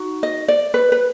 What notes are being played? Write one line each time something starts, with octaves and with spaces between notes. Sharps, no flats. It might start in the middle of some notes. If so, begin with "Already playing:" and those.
Already playing: D#4 F#4
D#5
D5
B4
B4